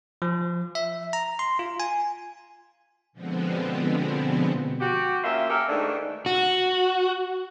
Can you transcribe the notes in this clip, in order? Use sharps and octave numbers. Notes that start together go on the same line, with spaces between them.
F3
E5
A#5
C6
F4
G#5
B2 D3 F3 G#3 B3 C4
F#4 G4
A#3 C#4 F4 E5
A#3 G4 A4 A#4
G#2 D#3 E3 A3 D4
F#4